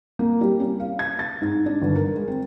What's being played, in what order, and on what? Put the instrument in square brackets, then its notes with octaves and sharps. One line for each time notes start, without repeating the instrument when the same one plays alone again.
[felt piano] A#3
G3
C#4
F5
G#6
A6
G#2
D4
G1
A#4
G#3
C4